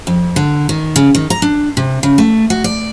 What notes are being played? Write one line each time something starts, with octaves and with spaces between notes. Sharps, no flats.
F2
D3
D#3
C#3
D#3
A#5
D4
C3
C#3
A3
F#4
D5